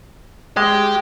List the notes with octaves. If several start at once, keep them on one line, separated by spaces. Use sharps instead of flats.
G#3 G4